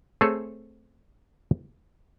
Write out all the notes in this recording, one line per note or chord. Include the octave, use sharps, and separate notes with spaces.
A3 C4 G#4 A4 C#5